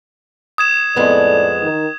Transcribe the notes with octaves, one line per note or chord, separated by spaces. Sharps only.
D#6 G#6 E7
F2 A2 G#3 B3 A4 D5
D#3